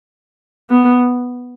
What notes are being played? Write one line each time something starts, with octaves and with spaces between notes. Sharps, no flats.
B3